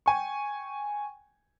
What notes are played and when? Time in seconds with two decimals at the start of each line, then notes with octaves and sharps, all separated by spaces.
0.06 G5 G#5 C#6